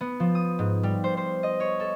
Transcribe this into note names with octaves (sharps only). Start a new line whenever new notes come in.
B3
F3
D#6
G#2
G3
C5
C5
D#5
C#5
A4